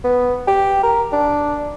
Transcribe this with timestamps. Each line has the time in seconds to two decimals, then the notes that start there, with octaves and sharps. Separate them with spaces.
0.04 B3
0.48 G4
0.83 A#4
1.13 D4